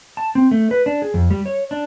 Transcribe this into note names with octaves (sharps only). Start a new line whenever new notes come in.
A5
C4
A3
B4
D4
G#4
F2
G3
C#5
D4